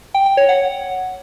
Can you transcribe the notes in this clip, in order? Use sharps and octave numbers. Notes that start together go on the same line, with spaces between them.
G5
G5
C#5
F#5